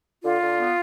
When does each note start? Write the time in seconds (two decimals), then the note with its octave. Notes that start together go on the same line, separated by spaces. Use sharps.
0.24 D3 F4
0.41 D3
0.58 B3